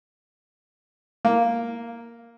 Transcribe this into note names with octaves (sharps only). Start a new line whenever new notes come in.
A#3